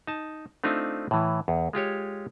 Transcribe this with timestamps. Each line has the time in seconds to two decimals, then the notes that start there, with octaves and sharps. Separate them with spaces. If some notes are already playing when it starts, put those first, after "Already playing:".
0.07 D#4 A5
0.64 A3 C4 D4 D#4 F4
1.11 A2 E3
1.48 E2
1.73 G#3 F4 G4 C#5